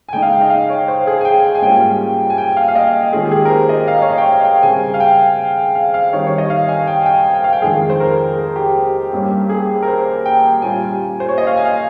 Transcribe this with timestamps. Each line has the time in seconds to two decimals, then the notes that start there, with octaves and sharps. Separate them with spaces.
0.09 G#5
0.13 C#3 G#3 D#4 G5
0.22 F5
0.32 G5
0.42 D#5
0.50 F5
0.70 C#5
0.88 C5
1.07 G#4
1.21 G#5
1.25 G5
1.44 G5
1.55 G#5
1.62 G#2 G3 A#3 C#4 F4 G5
2.30 G#5
2.38 G5
2.57 F5
2.68 F5
2.75 D#5
3.13 D#3 G#3 C#4 F4 G#4
3.25 G4
3.31 G#4
3.45 A#4
3.50 C5
3.69 D#5
3.88 F5
3.95 D#5
4.02 C#5
4.10 D#5
4.18 G5
4.25 F5
4.45 G5
4.63 C#3 G3 C4 G#5
4.94 F5
5.00 G5
5.75 F5
5.94 F5
6.13 D#3 G3 C4 D#4 C#5
6.27 C#5
6.38 D#5
6.50 F5
6.68 G#5
6.87 G5
7.03 G#5
7.06 G5
7.26 G#5
7.34 G5
7.44 F5
7.53 G5
7.62 F2 D#3 G#3 G#4
7.90 C5
8.00 A#4
8.37 G#4
8.56 G4
9.13 G2 G3 A#3 C#4
9.49 G#4
9.83 A#4
9.88 C5
10.25 G5
10.62 A#2 G3 C#4 F4 G#5
11.20 C5
11.29 C#5
11.38 D#5
11.47 F5
11.57 G#5
11.65 F5